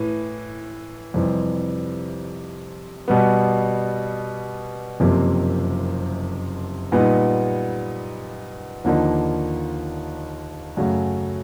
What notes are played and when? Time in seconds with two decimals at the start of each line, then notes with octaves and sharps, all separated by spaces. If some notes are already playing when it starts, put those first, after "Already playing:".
Already playing: A2 E3
1.14 F2 C3 E3 G3
3.08 B2 G3 B3
5.00 F#1 F2 C3 F3 A#3
6.92 A#2 G3 B3 D#4
8.84 D#2 D3 F3 A#3 D#4
10.77 F#2 C#3 F#3 A3